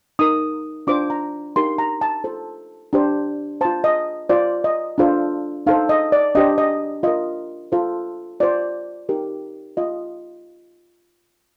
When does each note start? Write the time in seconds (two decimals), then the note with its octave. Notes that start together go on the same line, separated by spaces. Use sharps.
0.19 D#4 A#4 D#6
0.87 D4 F4 C5 D6
1.10 A#5
1.56 D#4 G4 A#4 C6
1.78 A#5
2.01 A5
2.24 F4 A4 C5
2.93 D4 G4 C5
3.61 C5 A5
3.65 F4
3.84 D#5
4.29 F4 C5 D5
4.64 D#5
4.98 D4 F4 A4 C5
5.67 D#4 A4 C5 F5
5.89 D#5
6.12 D5
6.35 D4 G4 C5 D#5
6.58 D#5
7.03 F4 A#4 D#5
7.72 F4 A4 C5
8.40 F4 C5 D5
9.09 D#4 G4 A#4
9.77 F4 D#5